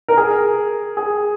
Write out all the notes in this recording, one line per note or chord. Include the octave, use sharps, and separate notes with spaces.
A#4
G#4
G#4